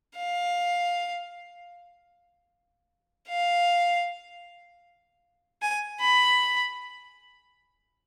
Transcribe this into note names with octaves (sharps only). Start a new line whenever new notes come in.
F5
F5
G#5
B5